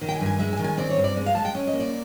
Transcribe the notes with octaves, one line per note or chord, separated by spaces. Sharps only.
D#3
G5
G#5
G2
G#5
G#3 E5
G#5
D#3
G#5
C4 D5
C#5
G2
D5
G#3
F5
G#3 A5
G5
C#4
D#5
A#3
D5